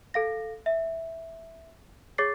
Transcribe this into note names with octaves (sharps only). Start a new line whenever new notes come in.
A4 F5 A#6
E5
G#4 C#5 D6 A6 C7